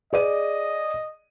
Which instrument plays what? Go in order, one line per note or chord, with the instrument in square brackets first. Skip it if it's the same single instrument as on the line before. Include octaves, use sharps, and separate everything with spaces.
[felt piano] G#4 D5 D#7 [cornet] D#5